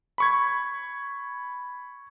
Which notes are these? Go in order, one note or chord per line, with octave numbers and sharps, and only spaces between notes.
B5 C#6 G#6